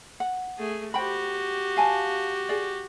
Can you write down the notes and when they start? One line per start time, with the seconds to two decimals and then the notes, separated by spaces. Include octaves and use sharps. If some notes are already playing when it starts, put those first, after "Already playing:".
0.20 F#5
0.58 A3 G#4
0.94 F#4 G4 C5 G5 B5
1.77 F5 G#5 A5
2.49 G#4 D5